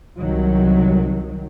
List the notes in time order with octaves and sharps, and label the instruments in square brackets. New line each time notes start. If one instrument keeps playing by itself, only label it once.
[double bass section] C2 D#3 F#3